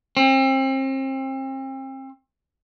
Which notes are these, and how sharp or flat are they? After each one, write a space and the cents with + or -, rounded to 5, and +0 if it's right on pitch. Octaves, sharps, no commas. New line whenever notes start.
C4 +35